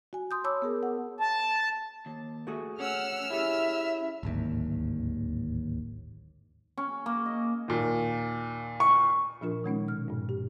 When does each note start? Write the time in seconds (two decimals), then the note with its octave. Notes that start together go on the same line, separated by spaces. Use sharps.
0.13 F#4 G#5
0.31 C6 D#6 G6
0.44 C#5 A5 B5 C6 D6 E6
0.62 B3 G#4 A#4
0.83 F#5
1.20 A5
2.06 D#2
2.47 A3 F#4 G#4
2.80 C#4 F#5 E6 F6
3.30 E4 G4 G#4 E5
4.23 D1 G#1 D#2
6.77 C#4
7.06 A#3
7.26 D#5
7.68 D#2 A#2
8.80 C#6
9.41 A#2 F3 D4 F4 A#4
9.64 D#3 G#3 C#4 D#4
9.88 B2 F6
10.08 G2 A#2
10.29 G4